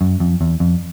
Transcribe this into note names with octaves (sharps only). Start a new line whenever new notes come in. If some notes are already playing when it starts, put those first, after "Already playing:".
F#2
F2
E2
F2